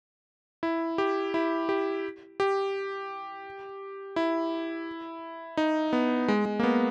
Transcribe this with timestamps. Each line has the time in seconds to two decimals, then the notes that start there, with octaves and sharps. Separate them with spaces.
0.63 E4
0.98 G4
1.34 E4
1.69 G4
2.40 G4
4.16 E4
5.57 D#4
5.93 B3
6.28 G#3
6.45 G#3
6.60 A#3
6.63 B3